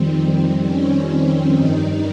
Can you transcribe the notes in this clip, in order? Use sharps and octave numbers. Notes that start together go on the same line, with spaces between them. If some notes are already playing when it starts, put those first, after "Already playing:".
Already playing: F2 D#3 G3 C4
C4
C#4
G2 D#3 G3 D#4